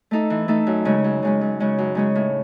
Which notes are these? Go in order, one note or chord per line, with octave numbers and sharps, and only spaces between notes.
A3 D#4 A4
E3
A3 D#4 A4
F#2
C#3 G#3 C#4
F#2
C#3 G#3 C#4
F#2
C#3 G#3 C#4
F#2
C#3 G#3 C#4
A2